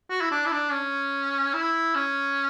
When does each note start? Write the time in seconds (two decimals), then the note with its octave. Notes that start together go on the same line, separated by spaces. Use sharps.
0.10 F#4
0.21 E4
0.31 D4
0.46 E4
0.52 D4
0.72 C#4
1.54 E4
1.95 C#4